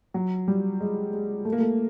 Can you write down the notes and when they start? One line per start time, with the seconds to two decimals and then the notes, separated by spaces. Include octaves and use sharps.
0.14 F#3
0.48 G3
0.81 G#3
1.13 G#3
1.45 A3
1.52 A#3
1.60 A3